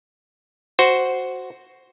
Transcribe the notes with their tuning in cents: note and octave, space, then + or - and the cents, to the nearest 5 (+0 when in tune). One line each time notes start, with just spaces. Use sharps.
F#4 +0 C5 +0